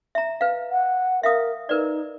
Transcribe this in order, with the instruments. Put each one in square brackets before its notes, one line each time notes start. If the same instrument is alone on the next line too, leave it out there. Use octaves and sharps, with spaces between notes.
[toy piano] E5 A#5
B4 F5
[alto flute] F#5
[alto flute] A#4 [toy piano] E5 F5 D#6
[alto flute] D#4 [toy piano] A#4 B4 D5